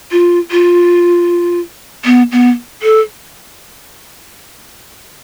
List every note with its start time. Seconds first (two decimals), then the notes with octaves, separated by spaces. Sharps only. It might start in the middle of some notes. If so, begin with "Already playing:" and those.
0.11 F4
0.51 F4
2.05 B3
2.32 B3
2.83 A4